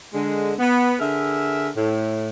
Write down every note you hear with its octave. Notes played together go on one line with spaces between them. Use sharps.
D3 G#3
B3
D3 G#4 A#4 E5
A2